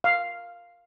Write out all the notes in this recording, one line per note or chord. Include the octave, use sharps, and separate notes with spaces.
F5